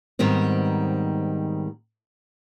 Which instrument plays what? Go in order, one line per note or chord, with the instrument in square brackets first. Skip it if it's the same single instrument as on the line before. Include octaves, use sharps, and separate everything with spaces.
[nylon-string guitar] G#2 D#3 G3 B3 C4